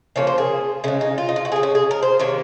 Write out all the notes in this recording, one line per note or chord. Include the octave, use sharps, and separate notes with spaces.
C#3 F3 A#3 C#5
C5
G#4
C#3 G#3 C#4
D#4
F4
D#4
F4
F#4
C#3 G#3 G#4
C#4
G#4
A#4
C5
C3 D#3 A#3 C#5